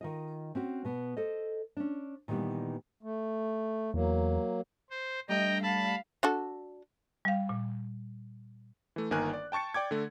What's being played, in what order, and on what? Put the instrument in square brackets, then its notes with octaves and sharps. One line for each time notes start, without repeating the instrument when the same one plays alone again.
[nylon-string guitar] D#3 F4 D#5
C4 C#4 F#4
B2 B3
A4 C5 D#5
C#4 D4
A#2 D#3 E3 G3 B3
[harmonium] A3
[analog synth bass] E2 [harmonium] F#3 A#3
[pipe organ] C5
[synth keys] G3 A3 D4 [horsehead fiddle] D#5 [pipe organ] G5 A#5
[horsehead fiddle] F5 [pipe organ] A5 B5
[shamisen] D4 F#4 A4
[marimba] G3 F5
A#2
[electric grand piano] E3 A3
G1 D#3 A#3 A#4 G#5 F#6
D5
G5 A5 C#6 A6 C#7
D5 G5 D6 G#6
D3 A3